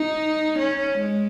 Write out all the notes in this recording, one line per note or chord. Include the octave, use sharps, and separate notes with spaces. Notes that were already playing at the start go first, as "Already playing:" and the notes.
Already playing: D#4
C#4
G#3